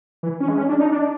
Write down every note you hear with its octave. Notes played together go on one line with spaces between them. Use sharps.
E3
C#4
G#3
C#4
D4
D#4
D4